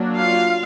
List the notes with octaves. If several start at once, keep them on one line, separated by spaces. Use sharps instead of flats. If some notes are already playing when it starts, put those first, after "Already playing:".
Already playing: F#3 A#3 D4
F4 F5